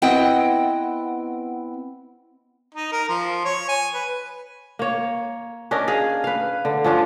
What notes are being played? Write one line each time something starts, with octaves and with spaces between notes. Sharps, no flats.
B3 C4 E4 D#5 F#5 G5
D#4
A#4
F3
C#5
G#5
B4
A#3 C#5
C#4 D4 A#4 D#5
G#4 F5
B4 F5
D3
F3 C#4 D4 F4